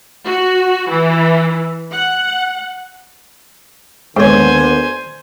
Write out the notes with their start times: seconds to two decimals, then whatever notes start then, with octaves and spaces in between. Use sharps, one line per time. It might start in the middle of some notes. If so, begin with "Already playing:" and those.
0.25 F#4
0.90 E3
1.92 F#5
4.17 D#2 G#2 D3 B3 C5 C#5 G#5